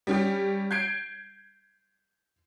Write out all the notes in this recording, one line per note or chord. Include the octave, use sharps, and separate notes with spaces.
G3 C#4 G4
G6 G#6 C7 D7